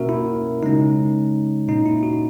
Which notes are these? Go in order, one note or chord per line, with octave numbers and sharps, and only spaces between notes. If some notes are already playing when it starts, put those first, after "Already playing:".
Already playing: B2 A#3 C#4 F#4 A#4 E5
E4
C#3 G#3 C#4 D#4
A#2 A#3 C#4 D#4
E4
F#4